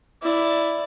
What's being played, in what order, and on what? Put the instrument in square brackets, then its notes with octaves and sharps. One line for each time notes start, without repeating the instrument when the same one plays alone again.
[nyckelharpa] E4 D5